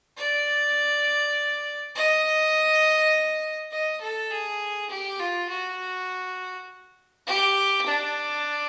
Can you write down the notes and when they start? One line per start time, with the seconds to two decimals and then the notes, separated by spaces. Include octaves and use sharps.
0.17 D5
1.95 D#5
3.71 D#5
4.01 A4
4.31 G#4
4.90 G4
5.20 F4
5.49 F#4
7.27 G4
7.87 D4